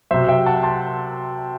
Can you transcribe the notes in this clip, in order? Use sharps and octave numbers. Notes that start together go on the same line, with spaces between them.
C3 F#3 C5 E5
E5 G5
F#5 A5
A5 C6